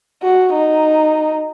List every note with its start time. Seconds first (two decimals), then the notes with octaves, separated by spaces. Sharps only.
0.23 F#4
0.53 D#4